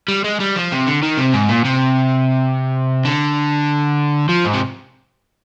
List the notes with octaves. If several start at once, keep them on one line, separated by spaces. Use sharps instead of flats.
G3
G#3
G3
F3
C3
D3
D#3
C3
G#2
A#2
C3
D3
F3
G#2
C3